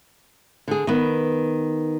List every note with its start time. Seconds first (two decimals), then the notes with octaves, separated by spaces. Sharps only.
0.68 D3 G#4
0.87 D#3 B3